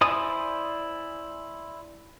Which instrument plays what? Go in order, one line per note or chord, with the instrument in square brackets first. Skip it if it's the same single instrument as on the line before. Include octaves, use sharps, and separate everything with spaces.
[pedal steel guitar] E4 C5 D5 G#5 D#6